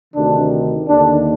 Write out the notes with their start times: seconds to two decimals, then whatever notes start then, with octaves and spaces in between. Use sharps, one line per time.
0.14 D2 C3 D#3 D4
0.89 D#2 D3 D4